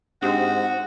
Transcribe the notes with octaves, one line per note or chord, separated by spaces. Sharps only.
G#2 C4 D4 F#4 G4 D#6